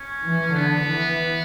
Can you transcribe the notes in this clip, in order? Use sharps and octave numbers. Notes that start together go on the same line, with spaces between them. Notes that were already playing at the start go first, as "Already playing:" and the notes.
Already playing: C#4
E3
D3 B3
E3